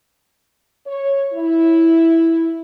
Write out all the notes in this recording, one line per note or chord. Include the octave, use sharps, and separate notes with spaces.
C#5
E4